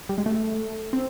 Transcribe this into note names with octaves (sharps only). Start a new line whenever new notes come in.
G3
G#3
A3
C4